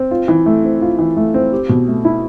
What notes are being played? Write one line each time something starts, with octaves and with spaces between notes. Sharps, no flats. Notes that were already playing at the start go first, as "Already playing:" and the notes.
Already playing: C4
F4
E3
A3
C4
F4
E3
A3
C4
G4
B2
A3
E4